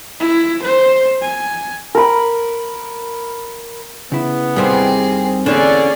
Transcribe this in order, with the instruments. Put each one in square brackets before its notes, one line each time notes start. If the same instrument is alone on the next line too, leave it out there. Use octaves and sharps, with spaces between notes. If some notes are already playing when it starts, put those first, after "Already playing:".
[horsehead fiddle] E4
C5
G#5
[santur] A#4 B5
[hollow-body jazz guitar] C#3 E4 [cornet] B3
[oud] D#2 C3 D#3 [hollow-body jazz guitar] G3 E4 C5 [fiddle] C4 G#4
[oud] E2 D3 [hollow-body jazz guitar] A#3 D4 [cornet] C#4 [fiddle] G#4 D5